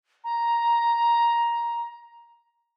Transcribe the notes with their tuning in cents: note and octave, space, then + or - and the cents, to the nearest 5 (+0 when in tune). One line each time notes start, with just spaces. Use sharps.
A#5 +10